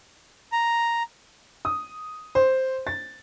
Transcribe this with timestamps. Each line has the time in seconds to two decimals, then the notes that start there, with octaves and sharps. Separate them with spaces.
0.52 A#5
1.65 D#6
2.35 C5
2.87 A6